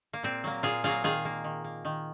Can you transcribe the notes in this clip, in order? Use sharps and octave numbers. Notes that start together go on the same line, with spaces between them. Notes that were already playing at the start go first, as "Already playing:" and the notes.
A#3
A#2 C4
F#3 A#3
A#2 F4 G#4
F#3 A#3 F4 G#4
D#3 F4 G#4
A#3
D#3
A#3
D#3